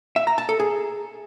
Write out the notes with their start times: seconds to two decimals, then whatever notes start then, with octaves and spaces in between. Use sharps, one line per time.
0.16 E5
0.27 A#5
0.38 A5
0.49 A4
0.60 G#4